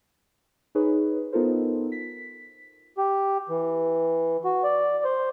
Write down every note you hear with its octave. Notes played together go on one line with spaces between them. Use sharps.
D#4 G#4 B4 C#5
B3 D#4 F4 A4 A#4 C5
B6
G4
E3
F#4
D5
C5